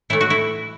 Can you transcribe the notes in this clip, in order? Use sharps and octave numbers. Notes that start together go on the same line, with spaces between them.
A2 E3 A3 E4
F#4
E4